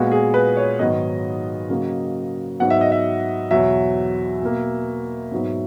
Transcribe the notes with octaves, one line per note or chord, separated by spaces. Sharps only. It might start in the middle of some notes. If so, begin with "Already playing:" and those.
Already playing: A#2 G#3 B3 F#4
G#4
B4
C#5
G#2 D#3 F#3 B3 D#5
C#3 F#3 A#3
G#2 F#3 B3 F#5
E5
D#5
E5
E2 B2 F#3 E5
B2 A#3
G#2 F#3 B3